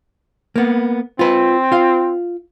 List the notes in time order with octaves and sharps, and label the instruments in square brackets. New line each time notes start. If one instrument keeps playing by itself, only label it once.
[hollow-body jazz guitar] A#3 B3
[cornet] C4 [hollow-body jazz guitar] F4 B4
[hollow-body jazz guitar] F4 F5